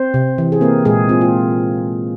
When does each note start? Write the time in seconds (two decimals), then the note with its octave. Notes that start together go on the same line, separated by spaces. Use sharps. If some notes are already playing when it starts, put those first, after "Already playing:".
Already playing: C4 C5
0.14 C3
0.38 E3
0.52 G#4
0.61 A#3 C4 A#4
0.85 A#2 G#3 G#4
1.09 C4 F4
1.21 F4